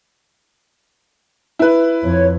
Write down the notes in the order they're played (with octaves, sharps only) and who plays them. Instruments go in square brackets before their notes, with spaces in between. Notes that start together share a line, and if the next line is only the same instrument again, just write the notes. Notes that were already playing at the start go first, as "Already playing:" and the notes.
[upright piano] E4 B4
[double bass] F2 [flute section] C#5